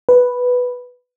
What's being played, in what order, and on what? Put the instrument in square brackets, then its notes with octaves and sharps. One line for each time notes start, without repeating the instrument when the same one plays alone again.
[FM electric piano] B4